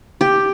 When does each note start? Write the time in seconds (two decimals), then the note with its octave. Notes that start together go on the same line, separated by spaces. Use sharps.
0.21 G4